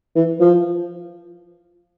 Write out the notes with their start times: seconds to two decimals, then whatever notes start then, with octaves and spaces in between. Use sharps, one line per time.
0.16 E3
0.40 F3